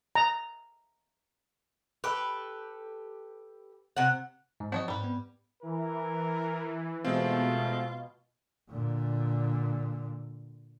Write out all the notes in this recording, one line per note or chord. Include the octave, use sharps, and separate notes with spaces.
A#5
G4 A4 B4
C3 F#5
G#2
F3 C4 F#4 C#5 D#5
G#2 G3 B4
B3
E3 A#4
B2 G#3 A3 C4 F4
A#2 D3